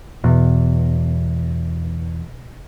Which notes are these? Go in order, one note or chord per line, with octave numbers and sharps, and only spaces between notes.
E2 B2